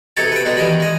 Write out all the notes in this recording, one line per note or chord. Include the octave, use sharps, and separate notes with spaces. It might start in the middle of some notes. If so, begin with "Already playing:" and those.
B1 C3 D#4 A4 C#5 A5
B4 G5
B2 G3 G#3 D#4
D#3 E3 D#5 B5
G#3 D#5